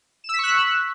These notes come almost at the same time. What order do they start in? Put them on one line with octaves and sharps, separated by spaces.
E7 E6 B6 C#6 F#6